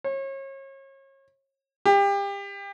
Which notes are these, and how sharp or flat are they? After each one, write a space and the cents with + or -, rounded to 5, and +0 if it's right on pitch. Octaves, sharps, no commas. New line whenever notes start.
C#5 -35
G4 +30